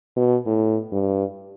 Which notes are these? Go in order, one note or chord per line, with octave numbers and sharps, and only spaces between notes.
B2
A2
G2